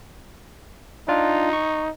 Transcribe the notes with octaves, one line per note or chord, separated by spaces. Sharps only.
D4 D#4 F4
C#6